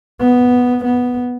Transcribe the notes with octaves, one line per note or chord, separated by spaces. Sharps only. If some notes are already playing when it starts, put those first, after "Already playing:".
B3
B3